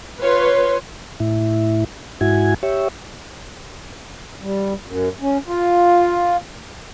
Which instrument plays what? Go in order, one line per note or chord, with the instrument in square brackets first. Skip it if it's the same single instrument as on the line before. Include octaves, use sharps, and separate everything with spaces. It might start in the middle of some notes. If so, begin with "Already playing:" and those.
[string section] F4 B4 C#5 C6
[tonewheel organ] A2 E4
G#2 E4 F#4 G#5
G4 C#5 E5
[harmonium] G3
F#2
C#4
F4